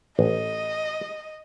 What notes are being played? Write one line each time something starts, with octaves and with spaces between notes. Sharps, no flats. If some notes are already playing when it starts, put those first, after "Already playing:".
A1 D#5